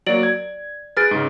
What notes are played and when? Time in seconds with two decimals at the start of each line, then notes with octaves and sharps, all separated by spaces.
0.06 F#3 A#3 D5 D7 F#7
0.23 G#6
0.97 G#4 B4 F6 A6 D7
1.11 G#2 C#3